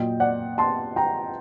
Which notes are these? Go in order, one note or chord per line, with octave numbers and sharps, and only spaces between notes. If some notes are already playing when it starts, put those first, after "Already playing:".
Already playing: A#2 F#3 D#5 G5
D5 F#5
A5 C6
G5 A#5